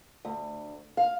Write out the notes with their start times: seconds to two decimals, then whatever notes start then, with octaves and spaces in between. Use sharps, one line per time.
0.25 D2
0.97 F5